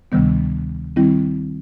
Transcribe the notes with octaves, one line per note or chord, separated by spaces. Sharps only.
D2 C3 D#3 G3 B3
D#3 G3 C4 E4